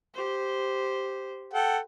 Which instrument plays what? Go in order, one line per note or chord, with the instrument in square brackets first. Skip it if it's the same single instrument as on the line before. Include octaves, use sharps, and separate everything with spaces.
[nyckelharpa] G4 C5
[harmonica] A4 F#5 G5